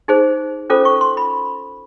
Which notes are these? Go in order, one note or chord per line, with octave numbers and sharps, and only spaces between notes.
D#4 G#4 C5
C#4 F4 A4 C5 D6
C#6
C6
B5